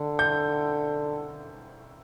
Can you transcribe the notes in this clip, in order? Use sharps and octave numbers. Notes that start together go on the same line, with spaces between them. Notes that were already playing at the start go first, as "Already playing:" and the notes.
Already playing: D3
G6